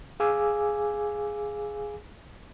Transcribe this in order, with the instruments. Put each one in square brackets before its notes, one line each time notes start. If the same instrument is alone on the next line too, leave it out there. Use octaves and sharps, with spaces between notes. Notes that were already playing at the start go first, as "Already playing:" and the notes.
[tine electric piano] G#4 F5 G#5 D6 E6